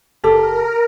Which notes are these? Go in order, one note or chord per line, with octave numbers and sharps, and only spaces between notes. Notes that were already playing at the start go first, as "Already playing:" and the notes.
F#1 G4 A4 A#4